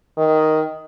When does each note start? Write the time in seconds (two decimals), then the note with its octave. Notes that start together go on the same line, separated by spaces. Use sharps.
0.18 D#3